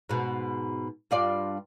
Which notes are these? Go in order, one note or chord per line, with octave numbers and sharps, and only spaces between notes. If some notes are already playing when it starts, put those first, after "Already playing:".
G#2 B2
G2 F4 D5